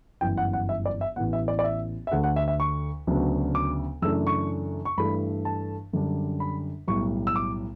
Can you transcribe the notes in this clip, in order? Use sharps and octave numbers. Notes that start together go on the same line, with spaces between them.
G1 F#2 E3 G5
F#5
F#5
E5
D5
E5
A1 A2 E3 B3 F#5
E5
D5
D5
E5
E5
D2 D3 A3 D4 F#5
F#5
E5
E5
C#6
D2 C#3 F#3 B3 D4
D6
F#2 C#3 E3 A3 D4 E6
C#6
C#6
G2 E3 A3 D4 B5
A5
F#2 D3 G3 D4
B5
B1 A2 G3 C#6
E6
D6